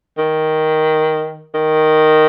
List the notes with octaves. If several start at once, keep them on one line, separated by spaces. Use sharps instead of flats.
D#3
D#3